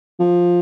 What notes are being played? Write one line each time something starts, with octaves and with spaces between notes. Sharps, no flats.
F3